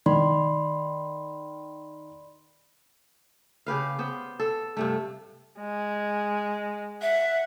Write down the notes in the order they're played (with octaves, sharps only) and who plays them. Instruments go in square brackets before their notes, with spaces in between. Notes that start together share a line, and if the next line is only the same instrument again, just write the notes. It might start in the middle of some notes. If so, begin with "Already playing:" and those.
[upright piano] D#3 [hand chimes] D5 B5 C6
[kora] C#3 G4 B4 F5
B3 C5
A4
G2 C3 A3
[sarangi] G#3
[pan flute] E5 [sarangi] F#5